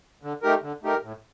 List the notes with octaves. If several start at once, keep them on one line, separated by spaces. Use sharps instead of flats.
D3
A3 D#4 G4 A#4
D3
A3 D#4 G4 A#4
A2